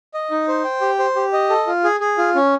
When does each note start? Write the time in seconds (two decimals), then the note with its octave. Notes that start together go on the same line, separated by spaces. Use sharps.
0.14 D#5
0.31 D#4
0.48 C5
0.64 G5
0.81 G4
0.99 C5
1.16 G4
1.33 D#5
1.50 A4
1.67 F4
1.84 G#4
2.00 G#4
2.18 F4
2.35 C#4